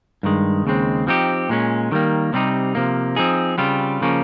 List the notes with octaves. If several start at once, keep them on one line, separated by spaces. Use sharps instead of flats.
G2 D#3 G#3
D#2 C#3 G#3 C4
F3 C4 D#4 G4
A#2 G#3 C#4
D#3 G3 A#3
C3 G3 C4 D#4
C3 F3 A#3
F3 C4 D#4 G#4
C#3 G3 C4 F4
C#3 F3 A#3 C#4